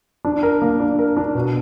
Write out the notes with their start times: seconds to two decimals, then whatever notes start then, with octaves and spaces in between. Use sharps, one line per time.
0.25 D4
0.43 A#4
0.62 A#3
0.80 D4
0.99 A#4
1.17 D4
1.35 B2